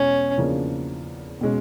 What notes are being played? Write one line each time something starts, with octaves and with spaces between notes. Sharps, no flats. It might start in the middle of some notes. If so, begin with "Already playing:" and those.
Already playing: E2 B2 G#3 C#4
E2 C#3 F3 A#3 D4
B2 G#3 C#4